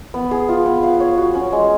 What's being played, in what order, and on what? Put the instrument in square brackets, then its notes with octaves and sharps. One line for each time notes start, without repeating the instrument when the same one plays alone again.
[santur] B3
G#4
F4
B3
F5
C#5
F#4
C#4
G#3